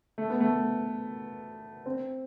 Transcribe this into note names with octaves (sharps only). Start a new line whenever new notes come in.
A3
B3
A3
C4